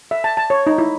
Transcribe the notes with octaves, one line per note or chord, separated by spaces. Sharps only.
E5
A5
A5
C#5
D#4
E4